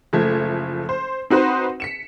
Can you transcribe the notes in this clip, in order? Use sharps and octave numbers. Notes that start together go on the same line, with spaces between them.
F#1 F3 A3 G#6
C5
C4 D#4 F#4 B4 C5
B6 C#7 E7